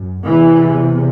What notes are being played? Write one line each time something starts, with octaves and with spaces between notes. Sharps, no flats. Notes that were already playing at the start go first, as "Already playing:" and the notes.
Already playing: F#2
E2 C3 E3